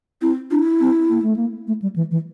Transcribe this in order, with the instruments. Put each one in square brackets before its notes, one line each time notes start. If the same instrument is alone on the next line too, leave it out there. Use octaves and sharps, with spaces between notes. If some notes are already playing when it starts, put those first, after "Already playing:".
[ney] C4 [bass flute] E4
[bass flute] D4 [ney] F4
[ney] E4
[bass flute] C4
A#3
A3
A#3
A3
G3
E3
E3